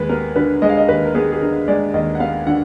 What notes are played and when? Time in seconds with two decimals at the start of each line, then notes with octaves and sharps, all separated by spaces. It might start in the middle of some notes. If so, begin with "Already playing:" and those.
Already playing: D#2 G#3 B4
0.09 B3 A#4
0.36 D3 B4
0.62 G#3 D#5
0.69 F5
0.77 D#5
0.88 D#2 B4
1.05 A#4
1.15 B3 G#4
1.32 G#4
1.41 D3 A#4
1.68 G#3 D5
1.94 D#2 D#5
2.15 F#5
2.20 B3 F5
2.47 D3 F#5